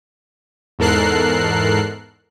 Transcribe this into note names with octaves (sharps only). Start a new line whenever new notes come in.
E2 G#2 A4 A#4 F#6 C7